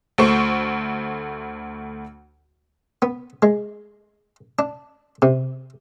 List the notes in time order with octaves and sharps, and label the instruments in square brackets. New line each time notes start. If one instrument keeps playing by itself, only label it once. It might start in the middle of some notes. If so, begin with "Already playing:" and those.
[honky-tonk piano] D2 A3 C5 C#6
[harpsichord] B3
G#3
D4
C3